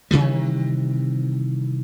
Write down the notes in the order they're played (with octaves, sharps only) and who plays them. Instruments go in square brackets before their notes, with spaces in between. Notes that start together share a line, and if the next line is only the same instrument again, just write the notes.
[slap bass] C3 D#3 E3 G3